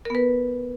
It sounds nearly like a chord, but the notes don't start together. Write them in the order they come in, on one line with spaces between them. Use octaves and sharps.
A#4 B3 B4